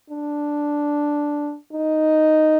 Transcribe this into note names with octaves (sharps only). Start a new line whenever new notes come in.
D4
D#4